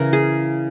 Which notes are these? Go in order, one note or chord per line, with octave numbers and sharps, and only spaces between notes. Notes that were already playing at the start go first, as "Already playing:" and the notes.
Already playing: C#3 E3 A#4
G#4